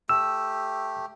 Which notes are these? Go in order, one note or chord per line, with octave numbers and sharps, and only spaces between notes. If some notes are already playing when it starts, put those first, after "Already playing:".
A3 G4 E6